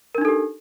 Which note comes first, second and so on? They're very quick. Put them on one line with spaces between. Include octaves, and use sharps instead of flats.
A#4 D4 D#4 A4 G4